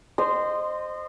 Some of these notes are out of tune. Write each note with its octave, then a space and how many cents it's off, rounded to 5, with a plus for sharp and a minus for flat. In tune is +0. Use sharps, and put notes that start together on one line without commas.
C5 +0 D#5 -25 C6 -20